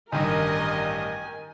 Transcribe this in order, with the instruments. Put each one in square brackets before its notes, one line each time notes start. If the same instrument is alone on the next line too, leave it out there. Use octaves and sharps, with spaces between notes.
[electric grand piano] A1 G2 G3 [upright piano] D#3 [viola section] A#4 D#5 [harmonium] G#5